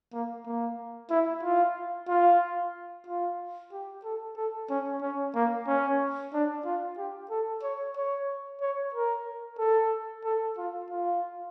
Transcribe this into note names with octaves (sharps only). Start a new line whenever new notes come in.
A#3
A#3
E4
F4
F4
F4
G4
A4
A4
C#4
C#4
A#3
C#4
D4
F4
G4
A4
C#5
C#5
C#5
A#4
A4
A4
F4
F4